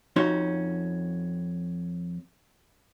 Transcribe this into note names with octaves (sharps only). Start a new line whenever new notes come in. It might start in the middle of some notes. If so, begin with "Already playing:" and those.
F2 C#4 D#4 F#4 C#5 C6